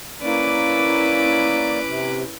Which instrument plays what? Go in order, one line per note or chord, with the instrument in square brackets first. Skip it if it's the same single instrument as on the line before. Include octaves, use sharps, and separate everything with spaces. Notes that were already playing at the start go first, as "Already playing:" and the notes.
[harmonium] A#3 D5 [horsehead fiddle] C#4 E4 [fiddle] B4 D6
[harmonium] C3